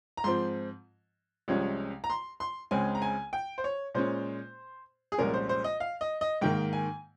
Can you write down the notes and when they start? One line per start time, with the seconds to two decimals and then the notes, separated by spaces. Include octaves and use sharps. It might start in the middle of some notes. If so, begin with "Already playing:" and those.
0.17 A#5
0.24 G#2 F3 C4 C6
1.48 C2 C3 F3 G#3 C#4
2.04 A#5
2.10 C6
2.40 C6
2.71 C#2 C#3 G#3 C4 G#5
2.95 A#5
3.02 G#5
3.33 G5
3.58 C5
3.64 C#5
3.95 A#2 G#3 C#4 C5
5.12 G#4
5.18 C2 A#2 F3 G#3 C#4 A#4
5.34 C5
5.49 C5
5.64 D#5
5.80 F5
6.01 D#5
6.21 D#5
6.41 G#2 D#3 A#3 G5
6.73 G#5